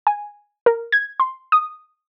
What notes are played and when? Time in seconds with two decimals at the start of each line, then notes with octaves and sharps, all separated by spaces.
0.07 G#5
0.66 A#4
0.92 G#6
1.20 C6
1.52 D#6